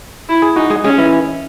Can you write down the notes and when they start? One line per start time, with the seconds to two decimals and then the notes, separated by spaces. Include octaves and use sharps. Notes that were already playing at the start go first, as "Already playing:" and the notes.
0.29 E4
0.42 G#4
0.56 D#4 F#4
0.70 G#3 G#4
0.84 G#3 C#4 G#4
0.98 E3 E4